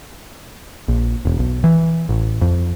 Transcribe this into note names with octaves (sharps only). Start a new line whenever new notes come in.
A#1
E1
B1
E3
A1
F2